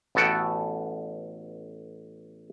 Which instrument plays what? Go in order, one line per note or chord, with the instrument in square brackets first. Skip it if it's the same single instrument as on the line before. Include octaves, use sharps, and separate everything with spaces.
[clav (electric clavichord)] A1 B3 F#4 A4 F#5 G5